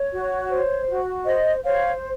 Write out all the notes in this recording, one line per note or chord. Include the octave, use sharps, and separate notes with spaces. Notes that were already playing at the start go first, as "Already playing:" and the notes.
Already playing: C#5
F#4
C5
F#4
C5 D#5
C5 C#5 F5